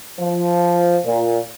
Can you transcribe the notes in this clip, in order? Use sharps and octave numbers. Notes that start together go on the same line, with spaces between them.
F3
A#2